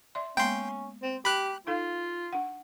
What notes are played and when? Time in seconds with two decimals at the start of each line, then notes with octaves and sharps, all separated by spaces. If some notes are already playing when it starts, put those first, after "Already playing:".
0.15 D5 E5 C6
0.37 G#3 A#3 B3 C#4 G5 C6
1.03 C4
1.25 G4 B5 F#6
1.67 D#4 F4 A4 F5
2.33 D4 F#5